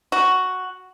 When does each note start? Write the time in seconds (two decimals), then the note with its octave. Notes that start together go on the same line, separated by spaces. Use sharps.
0.12 F#4